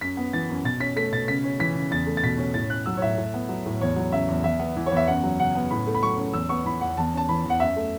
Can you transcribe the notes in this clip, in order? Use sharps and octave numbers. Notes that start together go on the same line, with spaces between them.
F#2 B6
B3
E3 A6
F#2
B2 A6
C#4 B6
A3 B6
B2 A6
C#3 B6
C#4
E3 B6
C#3
E2 A6
A3
A6
B2 B6
C#4
A2 A6
C#4 F#6
F#3 E6
C#5
A2 E5
A2
B3
F#3
A2
E2 C#5
F#3
C#3 E5
E2
E2 E5
B3
E3
C#5
E2 E5
F#2 F#5
F#3
C#3 F#5
B3
A2 B5
A3
B5
F#3 C#6
C#4
E2 E6
B3 C#6
E3 B5
E2 F#5
E2 A5
C#4 A5
E3 B5
E2 F#5
F#2 E5
A3